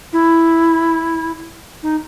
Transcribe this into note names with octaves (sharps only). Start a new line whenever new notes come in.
E4
D#4